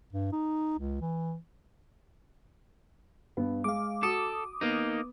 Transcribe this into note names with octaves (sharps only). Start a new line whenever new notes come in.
G2
D#4
C#2
E3
G2 B3
G#3 F5 D6
F#4 A4 D6 D#6
A#3 B3 D#4